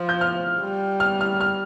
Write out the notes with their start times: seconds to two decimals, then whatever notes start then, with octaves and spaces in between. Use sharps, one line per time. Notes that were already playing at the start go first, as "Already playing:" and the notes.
Already playing: F3
0.09 G6
0.21 F6
0.61 G3
1.00 F6
1.21 F6
1.41 F6